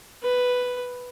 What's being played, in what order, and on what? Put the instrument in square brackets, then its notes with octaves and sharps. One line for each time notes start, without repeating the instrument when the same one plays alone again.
[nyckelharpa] B4